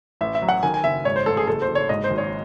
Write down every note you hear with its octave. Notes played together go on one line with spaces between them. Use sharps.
A1 E5
E5
F#3
F#5
D#3 G#5
G#5
F#1 E5
G#2 C#5
C5
A1 A4
G#4
F#1 A4
C5
F#1
C#5
G#2 D#5
C5
G#1
C#5